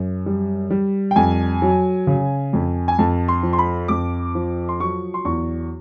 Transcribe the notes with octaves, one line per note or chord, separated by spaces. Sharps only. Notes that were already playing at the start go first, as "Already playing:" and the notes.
Already playing: F#2
G3
G3
G5
F2 G#5
F#3
C#3
F2
G#5
F2 A5
C6
F3
C6
B5
F2 D6
F3
C6
F#3 C#6
C6
E2 C#6